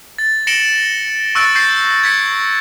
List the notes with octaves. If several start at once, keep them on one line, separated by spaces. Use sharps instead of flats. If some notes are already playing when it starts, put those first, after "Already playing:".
A6
A#6 C#7 D7 E7 F#7 G7
C#6 E6 F#6 A6 D7
C#6 G6 A6 A#6 C7
G#6 B6 C#7